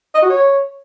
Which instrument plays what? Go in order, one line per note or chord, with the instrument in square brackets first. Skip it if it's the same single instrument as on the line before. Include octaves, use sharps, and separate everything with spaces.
[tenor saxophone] D#5
F#4
C#5